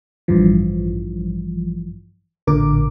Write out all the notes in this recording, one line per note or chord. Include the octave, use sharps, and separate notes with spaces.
A1 G2 E3 F3
A1 A#2 D3 A#4 D6